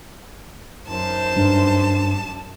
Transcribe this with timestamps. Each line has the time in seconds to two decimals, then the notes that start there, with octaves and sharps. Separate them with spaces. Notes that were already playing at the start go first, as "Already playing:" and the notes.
0.87 F#2 D#4 A#4 C5 A5
1.36 G2